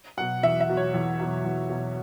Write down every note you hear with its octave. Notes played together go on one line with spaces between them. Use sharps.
B2 F#3 F#5
E2 E5
E5
B2 F#3
C#5
E2
B2 F#3
E2
B2 F#3